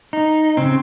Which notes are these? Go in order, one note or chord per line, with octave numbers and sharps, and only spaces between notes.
D#4
C#3 C4